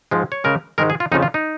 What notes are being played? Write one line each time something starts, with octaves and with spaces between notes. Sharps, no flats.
G#2 F3 G#3
C#5
C#3 G#3 A#4
G#2 D#3 G#3 A#4
G#4
F4
F2 C#3 F3 D#4
F4
D#4